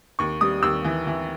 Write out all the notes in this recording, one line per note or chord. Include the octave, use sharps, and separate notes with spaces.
D#2 C#6
G3 D#6
D#2 E6
E3
E3